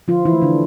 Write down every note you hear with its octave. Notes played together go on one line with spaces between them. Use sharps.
D3 F3 F4
E3 E4
A3
D3 D4